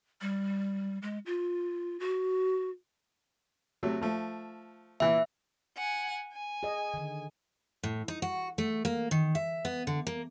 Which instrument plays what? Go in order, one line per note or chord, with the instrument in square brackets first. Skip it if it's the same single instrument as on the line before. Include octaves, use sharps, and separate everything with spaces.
[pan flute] G3
G#3
F4
F#4
[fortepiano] C3 F#3 A3
F3 A3
[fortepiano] A#2 E3 [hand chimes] E5
[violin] F#5 G#5
G#5
[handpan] G#4 D#5
D3 D#3
[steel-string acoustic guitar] A2
D#4
F#4
A3
A#3
D#3
E5
B3
D3
A#3